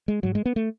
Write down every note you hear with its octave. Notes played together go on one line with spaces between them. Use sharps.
G#3
G#2 F#3
G#3
B3
A3